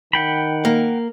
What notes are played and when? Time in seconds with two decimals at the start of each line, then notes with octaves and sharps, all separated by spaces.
0.13 D#3 F#5 G5 B5
0.65 A#3